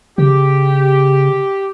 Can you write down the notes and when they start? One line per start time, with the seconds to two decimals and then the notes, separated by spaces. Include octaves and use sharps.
0.18 C#3 G4